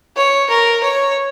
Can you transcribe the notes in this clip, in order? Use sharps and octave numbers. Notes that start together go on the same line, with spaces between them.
C#5
A#4
C#5